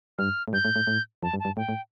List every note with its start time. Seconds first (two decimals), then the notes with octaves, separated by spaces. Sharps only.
0.18 G2 F6
0.48 A2
0.53 G2 G6
0.65 A2
0.76 A2
0.87 A2
1.23 F2 A5
1.34 G2
1.40 A5
1.45 G2
1.57 A2 G5
1.69 A2